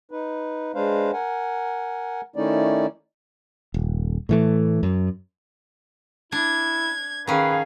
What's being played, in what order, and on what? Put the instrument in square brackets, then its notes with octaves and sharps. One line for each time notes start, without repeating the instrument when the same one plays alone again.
[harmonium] D#4 B4
G#3 D4 B4 C5 F5
A#4 F#5 G#5
D#3 A3 C#4 D#4 E4 D5
[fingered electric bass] D#1
A2 E3 A3
F#2
[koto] D4 [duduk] E4 [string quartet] G#6
[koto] D#3 C#4 [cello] G#4 F5 [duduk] B4